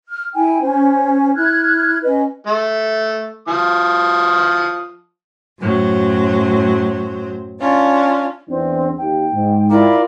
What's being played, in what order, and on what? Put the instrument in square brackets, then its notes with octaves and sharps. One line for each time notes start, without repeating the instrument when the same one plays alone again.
[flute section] F6
E4 G5 G#5
C#4 C5
E4 F6 F#6 G#6
C#4 B4 D#5
[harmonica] A3
F3 D#6
[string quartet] F#2 A2 F#3 C5
C#4 D4 F4
[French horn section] E2 E3 D4 [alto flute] C4
[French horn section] D#2 [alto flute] G5
[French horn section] G#2
[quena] E4 [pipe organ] F4 A#4 D5